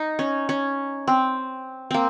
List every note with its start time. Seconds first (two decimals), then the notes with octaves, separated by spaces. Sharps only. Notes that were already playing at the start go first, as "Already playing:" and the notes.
Already playing: D#4
0.19 C#4
0.49 C#4
1.08 C4
1.91 A#3 C4